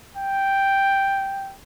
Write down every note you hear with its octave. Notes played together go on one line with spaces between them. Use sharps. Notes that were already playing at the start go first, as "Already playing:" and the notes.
G5